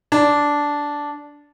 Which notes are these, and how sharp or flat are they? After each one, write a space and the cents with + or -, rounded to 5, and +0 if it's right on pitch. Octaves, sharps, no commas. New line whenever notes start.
D4 -10